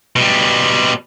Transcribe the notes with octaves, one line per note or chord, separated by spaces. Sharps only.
B2 G3